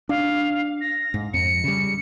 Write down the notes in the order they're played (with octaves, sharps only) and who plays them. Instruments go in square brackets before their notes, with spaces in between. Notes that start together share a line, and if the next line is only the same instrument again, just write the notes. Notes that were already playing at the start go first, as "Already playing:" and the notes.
[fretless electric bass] D4 [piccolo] F5
[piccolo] A#6
[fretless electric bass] G#2
[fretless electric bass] F2 [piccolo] C#7
[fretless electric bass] C#3 G3